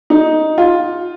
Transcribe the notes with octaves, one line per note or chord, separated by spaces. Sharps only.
D#4
F4